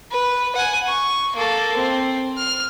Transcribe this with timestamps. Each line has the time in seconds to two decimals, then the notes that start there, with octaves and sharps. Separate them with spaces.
0.11 B4
0.55 F#5 G#5
0.87 C#6
1.36 A#3 A4
1.76 C4
2.38 F6